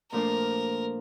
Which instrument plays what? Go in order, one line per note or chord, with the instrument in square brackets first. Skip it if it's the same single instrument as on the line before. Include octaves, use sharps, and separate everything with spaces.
[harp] A#2 F3 A3 D4 F4 [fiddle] A#4